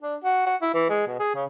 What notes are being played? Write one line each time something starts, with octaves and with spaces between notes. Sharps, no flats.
D4
F#4
F#4
E4
E3
G#3
B2
G#4
C#3